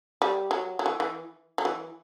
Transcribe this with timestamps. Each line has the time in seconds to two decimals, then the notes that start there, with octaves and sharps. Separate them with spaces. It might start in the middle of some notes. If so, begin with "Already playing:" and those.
0.22 G3
0.51 F#3
0.79 F#3
0.86 E3
1.00 E3
1.58 F#3
1.65 E3